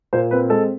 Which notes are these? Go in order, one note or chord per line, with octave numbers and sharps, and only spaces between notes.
A#2 C5
C4 B4
G#3 A4